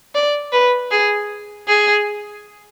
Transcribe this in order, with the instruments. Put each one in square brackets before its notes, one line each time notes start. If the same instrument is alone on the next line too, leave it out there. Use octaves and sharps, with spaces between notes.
[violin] D5
B4
G#4
G#4